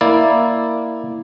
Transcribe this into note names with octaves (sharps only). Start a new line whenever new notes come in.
A#3 E4 D5